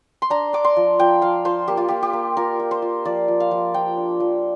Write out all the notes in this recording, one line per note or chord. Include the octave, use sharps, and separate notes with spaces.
C6
D4 A#5
D4 D6
C6
F3
F3 G5
F3 F5
F4 C5
A#3 G4
F4
A#3 G4
G4
A#3
F4 A#4
F4
C5
F4
F3 D5
F3
F5
F3
F3 G5
D4
F3